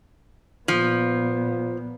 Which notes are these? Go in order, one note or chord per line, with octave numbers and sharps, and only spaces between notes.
A#2 F3 B3